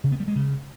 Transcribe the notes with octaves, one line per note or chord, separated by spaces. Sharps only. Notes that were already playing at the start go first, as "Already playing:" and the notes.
C#3
B3
G3
G#3
C#3